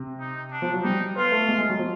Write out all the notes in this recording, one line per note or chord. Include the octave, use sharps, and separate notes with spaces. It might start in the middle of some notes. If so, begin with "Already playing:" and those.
Already playing: C3
D#4
D4
F3
F#3
G3 D#4
B3 F4
A3
G#3
G#3
F#3
F3